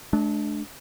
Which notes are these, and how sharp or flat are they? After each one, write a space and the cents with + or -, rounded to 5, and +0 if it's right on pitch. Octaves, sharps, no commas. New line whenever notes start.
A3 -45 D4 +0